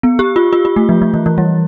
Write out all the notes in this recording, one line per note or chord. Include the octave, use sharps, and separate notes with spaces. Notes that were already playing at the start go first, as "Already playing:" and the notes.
B3
G4
F4
F4
F4
A3
F3
F3
E3
E3
G3